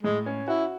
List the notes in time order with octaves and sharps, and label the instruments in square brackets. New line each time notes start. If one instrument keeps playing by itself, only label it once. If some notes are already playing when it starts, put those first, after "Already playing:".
[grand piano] A2 [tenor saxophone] G#3
[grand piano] C#4
[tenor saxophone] E4 [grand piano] F#4